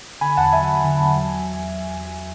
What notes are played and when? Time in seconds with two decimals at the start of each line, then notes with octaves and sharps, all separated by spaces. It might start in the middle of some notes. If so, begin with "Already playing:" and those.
0.21 D3 G#5 B5
0.37 E2 F#5 A5
0.53 F#3 E5 G#5
0.69 E2
0.84 D3
1.00 E2
1.16 F#3